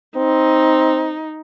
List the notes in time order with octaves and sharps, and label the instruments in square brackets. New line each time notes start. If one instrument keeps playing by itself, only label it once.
[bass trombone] C4 [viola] D#4